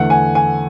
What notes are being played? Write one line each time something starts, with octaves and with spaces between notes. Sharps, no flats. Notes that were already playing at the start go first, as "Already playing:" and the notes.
Already playing: E2 D3 A3 F#5
G#5
G#5